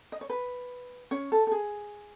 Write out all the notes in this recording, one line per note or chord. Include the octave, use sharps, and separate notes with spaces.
D#5
C#5
B4
C#4 C#5
A4
A4
G#4